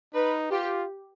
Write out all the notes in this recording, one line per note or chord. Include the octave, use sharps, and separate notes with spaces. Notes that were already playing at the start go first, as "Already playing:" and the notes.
D#4 B4
F4 G4